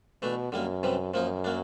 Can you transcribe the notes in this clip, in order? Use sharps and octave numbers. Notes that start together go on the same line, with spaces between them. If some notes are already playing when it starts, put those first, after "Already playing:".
B2 E3 A3 D4
F#2 D3 G3 A#3
C3 E3 G3
F#2 F3 A#3 D#4
F#3 A#3 D4